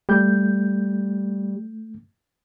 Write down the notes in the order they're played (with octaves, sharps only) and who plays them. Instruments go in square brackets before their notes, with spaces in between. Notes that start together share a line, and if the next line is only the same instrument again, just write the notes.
[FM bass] G3 [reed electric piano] A3 G6